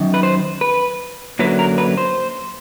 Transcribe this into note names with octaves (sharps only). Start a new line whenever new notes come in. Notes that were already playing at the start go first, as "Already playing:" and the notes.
Already playing: F#2 D#3
B4
C5
B4
F#2 D3 F#3 A#3 B4
A#4
B4
C5